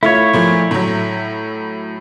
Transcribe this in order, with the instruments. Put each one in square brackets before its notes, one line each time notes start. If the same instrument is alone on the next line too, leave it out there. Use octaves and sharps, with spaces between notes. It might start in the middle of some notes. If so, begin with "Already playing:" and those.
[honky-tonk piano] A3 F4 [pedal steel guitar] E4 C#5
[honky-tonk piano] A#2 F3 A3
A2 F#3